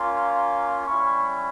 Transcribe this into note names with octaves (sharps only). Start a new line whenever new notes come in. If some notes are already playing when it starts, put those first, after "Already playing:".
Already playing: A#3 C#4 F4
G3 C#4 E4 C#6